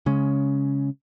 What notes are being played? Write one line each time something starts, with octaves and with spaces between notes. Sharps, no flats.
C#3 G#3 C#4